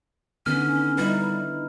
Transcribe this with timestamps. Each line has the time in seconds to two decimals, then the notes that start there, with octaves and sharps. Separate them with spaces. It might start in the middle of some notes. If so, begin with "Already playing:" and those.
0.46 D3 D#3 B3 C#4 F6
0.97 G3 D#4 E4 B4